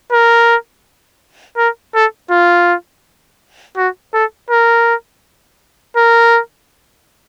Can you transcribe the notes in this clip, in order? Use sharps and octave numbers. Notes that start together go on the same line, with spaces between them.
A#4
A#4
A4
F4
F#4
A4
A#4
A#4